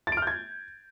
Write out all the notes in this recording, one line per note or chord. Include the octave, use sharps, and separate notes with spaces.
A6
D7
F6
G6
G#6